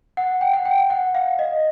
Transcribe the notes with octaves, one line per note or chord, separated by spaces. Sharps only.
F#5
G5
F#5
G5
G5
F#5
F5
D#5